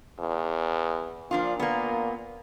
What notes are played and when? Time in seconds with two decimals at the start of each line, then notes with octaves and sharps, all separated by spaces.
0.20 E2
1.31 A#2 F3 D4 F4
1.60 A#3 B3